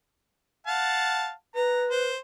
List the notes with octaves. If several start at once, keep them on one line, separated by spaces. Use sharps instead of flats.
F5 F#5 A5
B4 A#5
C5